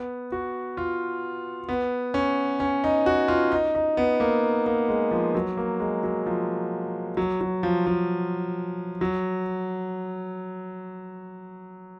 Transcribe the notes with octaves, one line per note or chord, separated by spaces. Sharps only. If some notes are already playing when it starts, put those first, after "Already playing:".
Already playing: B3
F#4
F4
B3
C#4
C#4
D#4
F#4
F4
D#4
D#4
B3
A#3
A#3
G#3
F3
F#3
A#3
G#3
F#3
F3
F#3
F#3
F3
F3
F#3